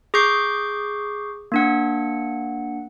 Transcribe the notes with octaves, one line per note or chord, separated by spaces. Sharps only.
G#4 C#6 D6 G6 C7
A#3 D4 F#5